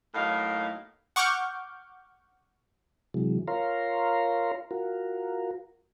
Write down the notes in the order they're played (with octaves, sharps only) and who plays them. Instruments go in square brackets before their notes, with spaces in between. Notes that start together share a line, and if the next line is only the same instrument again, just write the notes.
[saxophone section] A2 F#3 A#3 D#4 F5
[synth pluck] F#5 C#6 D6 F6 G6
[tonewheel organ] C3 E3 F#3 G#3
F4 A#4 C#5 F5 A#5 C6
F4 F#4 A#4